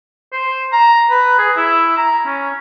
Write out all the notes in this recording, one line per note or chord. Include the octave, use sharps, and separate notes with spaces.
C5
A#5
B4
G#4
E4
A#5
C#4